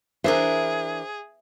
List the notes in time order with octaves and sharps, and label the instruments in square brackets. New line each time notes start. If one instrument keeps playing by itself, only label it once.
[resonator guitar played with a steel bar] E3 D4 A#4 [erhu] G#4 [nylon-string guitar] C5 [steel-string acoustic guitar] E5